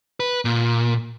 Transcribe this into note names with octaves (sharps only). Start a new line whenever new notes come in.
B4
A#2